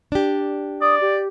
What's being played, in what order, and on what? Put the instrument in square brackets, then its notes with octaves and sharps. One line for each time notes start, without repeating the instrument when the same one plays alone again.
[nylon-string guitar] D4 G4
[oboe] D5 [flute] D#6
[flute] G4